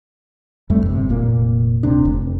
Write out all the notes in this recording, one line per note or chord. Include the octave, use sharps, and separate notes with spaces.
F2 G3 A3
G1 C3
F1 A#2 A#3
D1 G1 C3 D4
F1